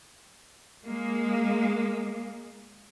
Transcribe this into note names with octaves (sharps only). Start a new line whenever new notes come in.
G#3 A#3